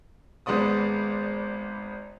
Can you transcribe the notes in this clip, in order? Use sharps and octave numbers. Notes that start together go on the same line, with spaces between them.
G#1 G#3 B3 D5 D#6